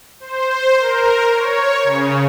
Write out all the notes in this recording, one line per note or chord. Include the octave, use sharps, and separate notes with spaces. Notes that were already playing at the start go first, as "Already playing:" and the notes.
C5
A#4
C#5
C#3